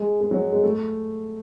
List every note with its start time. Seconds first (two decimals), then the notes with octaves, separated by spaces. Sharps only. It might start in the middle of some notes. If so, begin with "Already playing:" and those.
Already playing: G#3
0.21 G#3
0.31 F#3
0.52 G#3
0.63 A3